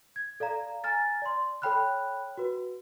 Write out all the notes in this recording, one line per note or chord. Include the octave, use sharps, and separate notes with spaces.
G#6
A4 D5 F5 A#5
G#5 A#5 F6 A6
D5 C6
A4 C#5 G5 B5 F6 F#6
F#4 B4